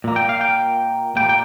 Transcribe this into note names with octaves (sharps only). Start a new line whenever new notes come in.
A#2 A#3
G5
F5
G5
A#2 G3 A#3 G5
G5